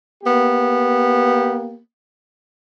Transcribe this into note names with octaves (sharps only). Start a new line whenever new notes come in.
A#3 B3 G4